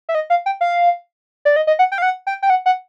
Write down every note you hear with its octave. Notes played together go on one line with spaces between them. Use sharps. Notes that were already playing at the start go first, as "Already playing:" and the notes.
E5
D#5
F5
G5
F5
D5
D#5
D#5
F#5
G5
F5
F#5
G5
G5
F#5
F#5